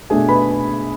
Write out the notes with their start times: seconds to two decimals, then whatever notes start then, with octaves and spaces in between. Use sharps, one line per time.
0.10 B2 A3 D4 G#4 G#5
0.29 B4 B5